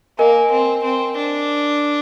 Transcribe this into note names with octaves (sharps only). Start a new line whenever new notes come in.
A#3 A#4 D#5 G#5
C4
C4
D4